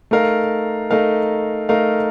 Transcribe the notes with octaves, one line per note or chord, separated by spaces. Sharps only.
A3 D#4 A#4 F5
A3 D#4 A#4 F5
A3 D#4 A#4 F5